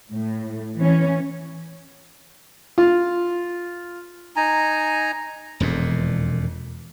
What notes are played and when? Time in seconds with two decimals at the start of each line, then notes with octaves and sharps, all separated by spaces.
0.11 A2
0.77 E3 C#4
2.78 F4
4.36 D#4 G#5 A#5
5.60 E1 F2 A#2